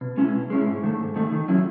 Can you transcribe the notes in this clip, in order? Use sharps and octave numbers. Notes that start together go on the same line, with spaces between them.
B2
G#3 C#4 E4
B2
G#3 C#4 E4
G#2
D#3 A3
G#2
D#3 A3
D#3
F#3 C#4 E4